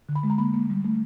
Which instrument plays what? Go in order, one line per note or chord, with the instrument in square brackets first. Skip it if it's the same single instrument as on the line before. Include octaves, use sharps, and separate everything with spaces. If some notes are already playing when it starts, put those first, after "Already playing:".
[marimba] D3
B5
G#3
A#5
A#3 B5
A#3
G3
A3